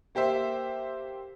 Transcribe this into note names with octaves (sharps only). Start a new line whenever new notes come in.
A#3 G4 C5 E5